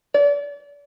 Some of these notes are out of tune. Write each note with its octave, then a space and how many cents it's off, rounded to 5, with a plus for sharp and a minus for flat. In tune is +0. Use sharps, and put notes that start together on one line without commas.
D5 -35